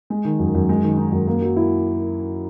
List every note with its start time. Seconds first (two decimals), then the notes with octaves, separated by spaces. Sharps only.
0.10 G#3
0.25 D#3
0.39 F#2
0.55 F#2
0.69 G#3
0.83 D#3
0.97 D#4
1.12 F#2
1.27 A#3
1.42 F#3
1.56 E4